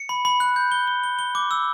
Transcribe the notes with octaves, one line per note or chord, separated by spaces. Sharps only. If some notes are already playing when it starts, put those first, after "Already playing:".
Already playing: C#7
B5
B5
F#6
G6
G7
G7
G7
G7
D6
E6